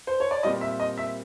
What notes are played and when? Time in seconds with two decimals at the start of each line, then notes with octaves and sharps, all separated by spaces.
0.07 C5
0.20 C#5
0.31 D5
0.43 A#2 G3 C4 D#5
0.61 E5
0.80 D#5
0.98 E5